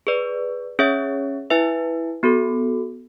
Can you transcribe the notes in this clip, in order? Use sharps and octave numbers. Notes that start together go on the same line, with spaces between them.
G#4 B4 D5
C#4 G#4 C#5 E5
E4 B4 E5 G#5
B3 F#4 A4